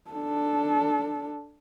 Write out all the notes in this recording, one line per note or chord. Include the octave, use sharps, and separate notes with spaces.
D4 A4